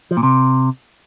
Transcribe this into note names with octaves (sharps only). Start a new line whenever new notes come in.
F3
A#2
C3